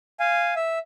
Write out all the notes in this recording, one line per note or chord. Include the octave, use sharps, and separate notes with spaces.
F5 G#5
E5